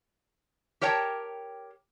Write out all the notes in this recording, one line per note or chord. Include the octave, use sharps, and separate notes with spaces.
G4 A#4 C#5 G5 A5